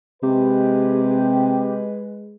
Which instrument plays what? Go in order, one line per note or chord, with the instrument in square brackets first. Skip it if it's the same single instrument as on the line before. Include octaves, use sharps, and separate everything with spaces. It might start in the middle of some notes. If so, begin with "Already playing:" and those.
[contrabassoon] C3 [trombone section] G#3 B4 [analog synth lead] G4